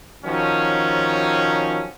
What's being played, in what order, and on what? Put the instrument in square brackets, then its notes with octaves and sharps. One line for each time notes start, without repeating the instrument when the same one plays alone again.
[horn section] D#3 F3 F#3 C#4